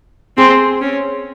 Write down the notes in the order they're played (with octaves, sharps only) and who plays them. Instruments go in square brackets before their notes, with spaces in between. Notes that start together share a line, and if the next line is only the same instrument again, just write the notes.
[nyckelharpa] C4 [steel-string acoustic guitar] G#4
[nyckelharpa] C#4